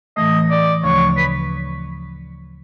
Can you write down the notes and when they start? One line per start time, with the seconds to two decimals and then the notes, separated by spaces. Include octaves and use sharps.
0.17 A2 E3 A3 D#5
0.50 D5
0.83 D2 C#3 F3 A3 C#5
1.17 B4